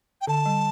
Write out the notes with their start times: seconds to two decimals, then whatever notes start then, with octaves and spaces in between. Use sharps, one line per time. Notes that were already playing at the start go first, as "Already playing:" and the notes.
0.21 G5
0.27 D3 A5
0.46 G3